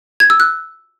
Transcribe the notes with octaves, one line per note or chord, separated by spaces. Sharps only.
G#6
E6
F#6